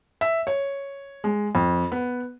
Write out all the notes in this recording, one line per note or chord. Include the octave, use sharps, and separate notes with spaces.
E5
C#5
G#3
F2
B3